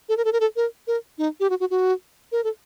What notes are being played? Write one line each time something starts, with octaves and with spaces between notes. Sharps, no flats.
A4
A#4
A4
A#4
A4
A#4
A#4
D#4
G4
F#4
F#4
F#4
A#4
A4